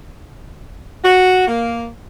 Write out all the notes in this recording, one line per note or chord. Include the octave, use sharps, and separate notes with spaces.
F#4
A#3